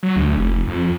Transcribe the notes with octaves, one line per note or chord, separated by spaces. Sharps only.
F#3
D2
F1
F2